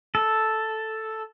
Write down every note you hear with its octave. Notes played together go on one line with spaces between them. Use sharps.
A4